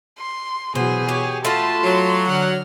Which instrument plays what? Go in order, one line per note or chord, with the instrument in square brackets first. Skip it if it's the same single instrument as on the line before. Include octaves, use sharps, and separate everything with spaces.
[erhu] C6
[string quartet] B2 E3 F#3 [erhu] G#4 [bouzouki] C5
[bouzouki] G4 [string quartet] C#5
[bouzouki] A3 F4 F#4 [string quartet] A5 B5 [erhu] C6
[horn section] F#3
[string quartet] D3 F6 [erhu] F#5